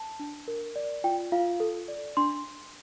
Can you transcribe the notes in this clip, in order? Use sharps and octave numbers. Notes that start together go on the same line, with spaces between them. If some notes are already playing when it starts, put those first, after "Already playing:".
Already playing: A5
D4
A#4
D5
F4 G5
F4 F5
A4
D5
D4 C6